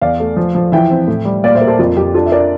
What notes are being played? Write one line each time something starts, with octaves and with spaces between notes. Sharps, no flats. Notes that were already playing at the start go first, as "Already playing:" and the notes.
E2 D5 F5
A3
F3
F3
E3 E5 G5
C4
A2
G3
A#2 D5 F5
C5 E5
A#3
A4 C5
F2 F4
F2 G4
D4 F4 A4
E5
D4 A#4 D5